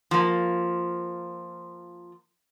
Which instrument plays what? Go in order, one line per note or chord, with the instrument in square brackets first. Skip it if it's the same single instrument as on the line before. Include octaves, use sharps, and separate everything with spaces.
[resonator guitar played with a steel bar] F3 A#3